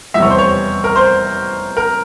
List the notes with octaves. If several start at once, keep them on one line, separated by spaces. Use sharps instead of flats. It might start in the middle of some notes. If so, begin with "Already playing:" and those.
F1 E2 E3 G3 E5
C#5
C5
C#5
A#4
C5
A#4